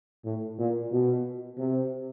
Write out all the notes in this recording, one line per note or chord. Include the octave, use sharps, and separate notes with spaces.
A2
A#2
B2
C3